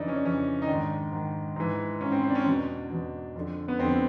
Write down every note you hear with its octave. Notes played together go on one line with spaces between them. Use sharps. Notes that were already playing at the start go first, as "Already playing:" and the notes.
Already playing: F2 C#3 E3 D4 D#4
C#4
D4
F2 C#3 E3 C#4
D#4
G#2 D#3 D4
G#2 D#3
G#2 E3
G#2 E3 C#4
C4
C4
D4
C#4
E2 B2 D4
E2 B2
F2 D3
B3
F2 D3 C4